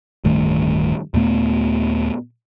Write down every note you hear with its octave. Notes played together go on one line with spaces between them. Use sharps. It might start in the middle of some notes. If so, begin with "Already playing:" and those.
D1 G2 D#3 A3
D#2 A#2 A3 B3